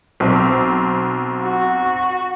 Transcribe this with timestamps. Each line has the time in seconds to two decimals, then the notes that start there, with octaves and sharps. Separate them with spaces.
0.20 B1 C4
1.43 F#4